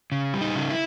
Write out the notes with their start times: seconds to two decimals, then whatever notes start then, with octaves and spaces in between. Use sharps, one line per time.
0.12 C#3
0.34 G3
0.41 D#4
0.56 C#3
0.71 E4